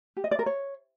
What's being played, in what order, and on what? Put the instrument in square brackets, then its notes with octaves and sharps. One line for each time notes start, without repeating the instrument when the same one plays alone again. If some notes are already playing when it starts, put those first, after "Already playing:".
[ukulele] G4
D#5
D5
A#4
C#5